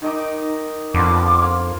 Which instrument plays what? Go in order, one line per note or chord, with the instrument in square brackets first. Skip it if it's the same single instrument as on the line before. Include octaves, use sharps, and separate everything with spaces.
[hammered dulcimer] D#3 D#5 D6 [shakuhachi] D#4
[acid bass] F2 [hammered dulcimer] D3 B3 F4 [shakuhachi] D6
[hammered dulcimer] A#3